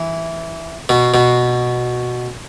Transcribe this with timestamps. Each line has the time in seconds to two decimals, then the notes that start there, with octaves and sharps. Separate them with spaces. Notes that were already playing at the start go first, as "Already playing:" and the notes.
Already playing: E3
0.89 B2
1.14 B2